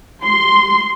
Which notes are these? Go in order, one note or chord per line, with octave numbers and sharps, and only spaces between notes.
C6